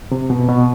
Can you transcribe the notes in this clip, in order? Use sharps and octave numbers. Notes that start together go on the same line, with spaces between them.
C3
B2
B2